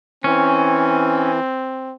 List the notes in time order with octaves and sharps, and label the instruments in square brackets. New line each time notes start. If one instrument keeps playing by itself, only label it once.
[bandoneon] E3 [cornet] C4 [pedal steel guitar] C#4